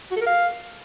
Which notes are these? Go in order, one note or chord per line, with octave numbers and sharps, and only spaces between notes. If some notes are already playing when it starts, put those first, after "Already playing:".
F#4
A4
A#4
F5